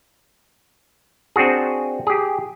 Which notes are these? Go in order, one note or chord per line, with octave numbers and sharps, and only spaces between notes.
C4 D4 F#4 G#4
G4 G#4